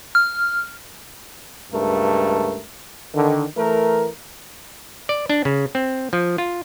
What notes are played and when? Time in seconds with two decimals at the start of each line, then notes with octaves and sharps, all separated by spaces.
0.15 F6
1.72 C#2 G2 A3 A#4
3.14 D3 D#3
3.57 E3 A3 A#4
5.09 D5
5.30 D4
5.45 C#3
5.75 C4
6.13 F3
6.38 F4